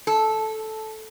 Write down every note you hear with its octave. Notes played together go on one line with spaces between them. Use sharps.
A4